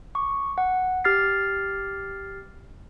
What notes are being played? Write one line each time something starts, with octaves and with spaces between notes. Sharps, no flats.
C#6 D6
F#5
G4 F6 A6 C7